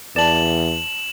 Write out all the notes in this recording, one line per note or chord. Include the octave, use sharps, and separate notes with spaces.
E2 D5 A5 E7 F#7